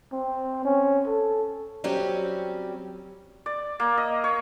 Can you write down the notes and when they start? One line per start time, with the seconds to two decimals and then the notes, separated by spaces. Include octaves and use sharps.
0.13 C4
0.65 C#4
1.07 A4
1.84 F#3 G3 C4 C#4 G4
3.46 D5
3.80 A#3
3.98 D#5
4.24 C#5